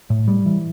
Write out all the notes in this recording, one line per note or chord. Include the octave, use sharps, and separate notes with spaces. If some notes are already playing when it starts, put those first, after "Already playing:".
A2
G3
E3